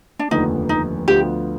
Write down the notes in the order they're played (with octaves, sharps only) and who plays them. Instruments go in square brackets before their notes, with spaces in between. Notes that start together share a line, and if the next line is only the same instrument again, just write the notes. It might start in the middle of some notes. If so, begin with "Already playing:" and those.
[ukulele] D4
[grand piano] F1 D#2 D3 F3 B3 [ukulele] D#4
[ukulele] D#4
[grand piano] D2 D3 F3 B3 F4 [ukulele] G4